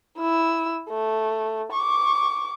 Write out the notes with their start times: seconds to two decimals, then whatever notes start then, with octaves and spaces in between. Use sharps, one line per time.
0.18 E4 E6
0.90 A3
1.72 C#6 D6